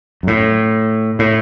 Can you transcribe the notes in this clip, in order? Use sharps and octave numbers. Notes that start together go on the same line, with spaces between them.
F#2
A2
A2